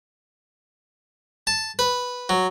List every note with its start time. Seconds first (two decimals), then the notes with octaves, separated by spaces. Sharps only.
1.47 A5
1.79 B4
2.29 F#3